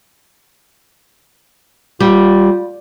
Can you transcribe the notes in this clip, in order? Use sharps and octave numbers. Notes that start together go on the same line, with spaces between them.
G3 F4